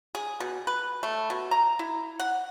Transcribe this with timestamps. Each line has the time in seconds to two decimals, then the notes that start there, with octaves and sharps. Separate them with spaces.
0.15 G#4
0.40 B2
0.67 B4
1.03 A3
1.30 B2
1.51 A#5
1.79 E4
2.20 F#5